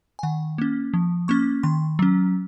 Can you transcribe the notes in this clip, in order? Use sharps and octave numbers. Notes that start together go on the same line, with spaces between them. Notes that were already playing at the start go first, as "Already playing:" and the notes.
G#5
D#3 F#5
A#3 C#4
F3
A#3 C#4 C#6
D#3 C6
F#3 C#4